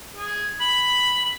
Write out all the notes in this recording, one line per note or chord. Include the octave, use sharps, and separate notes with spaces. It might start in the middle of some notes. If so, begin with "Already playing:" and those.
G#4
B5 F#7